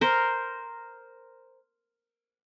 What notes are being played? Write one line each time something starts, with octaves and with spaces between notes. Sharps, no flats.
A#4 C5